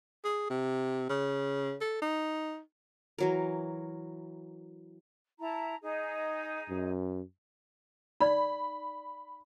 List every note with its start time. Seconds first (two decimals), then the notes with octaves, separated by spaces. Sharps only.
0.24 G#4
0.50 C3
1.09 C#3
1.81 A4
2.02 D#4
3.18 E3 F#3 A#4
5.39 E4 A5 A#5
5.81 D#4 G#4
6.70 F#2
8.20 D#4 D5 B5